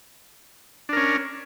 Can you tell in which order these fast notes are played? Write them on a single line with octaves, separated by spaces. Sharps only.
D4 A#4 C#4